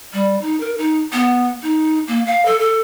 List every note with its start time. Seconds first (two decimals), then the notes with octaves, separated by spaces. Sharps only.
0.13 G3
0.41 D#4
0.60 A#4
0.78 D#4
1.13 B3
1.63 D#4
2.08 A#3
2.27 F5
2.45 A4
2.60 A4